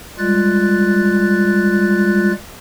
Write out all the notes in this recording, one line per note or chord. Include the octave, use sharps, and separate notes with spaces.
G3 G#3 F4 F#6 A6